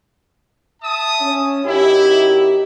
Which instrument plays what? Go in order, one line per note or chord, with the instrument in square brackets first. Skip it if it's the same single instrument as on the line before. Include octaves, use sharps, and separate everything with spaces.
[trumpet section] E5 A5 D#6
[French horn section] C#4
[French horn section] F#2 D#4 G4 [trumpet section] E4